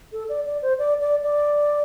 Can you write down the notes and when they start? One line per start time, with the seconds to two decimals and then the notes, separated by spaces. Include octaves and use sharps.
0.12 A4
0.29 D5
0.46 D5
0.62 C5
0.79 D5
1.00 D5
1.23 D5